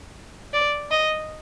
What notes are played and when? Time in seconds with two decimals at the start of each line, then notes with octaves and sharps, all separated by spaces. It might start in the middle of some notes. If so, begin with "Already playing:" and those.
0.53 D5
0.91 D#5